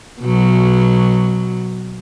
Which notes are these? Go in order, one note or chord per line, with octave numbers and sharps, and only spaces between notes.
B2 F#3